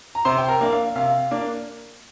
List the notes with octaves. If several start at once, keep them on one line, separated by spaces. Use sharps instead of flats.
A#5
C3 C5 C6
G5
A#4 A#5
A#3 D4 D5
F5
C3 F5
A#3 D4